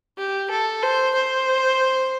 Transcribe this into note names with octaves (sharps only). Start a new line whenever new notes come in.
G4
A4
C5
C5